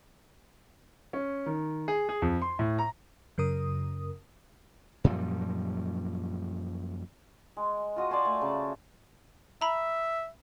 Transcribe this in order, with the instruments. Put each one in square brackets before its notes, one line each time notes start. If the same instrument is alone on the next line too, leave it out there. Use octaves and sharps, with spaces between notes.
[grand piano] C#4
D#3
G#4
G#4
F2
C6
A2
A#5
[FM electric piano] F#2 C#3 A#4 D#6
[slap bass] F#2 A#2 F3 G3
[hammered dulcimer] G#3
F4 F#4 D#5
D5 G#5 A5 C6
A3
C#3
[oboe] E5 [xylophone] A#5 B5